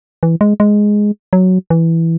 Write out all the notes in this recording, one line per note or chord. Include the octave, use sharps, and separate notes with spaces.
E3
G#3
G#3
F#3
E3